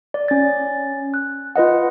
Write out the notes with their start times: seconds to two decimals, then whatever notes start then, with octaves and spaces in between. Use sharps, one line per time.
0.14 D5
0.28 C#4 A6
1.14 F#6
1.56 F4 B4 D#5 F#5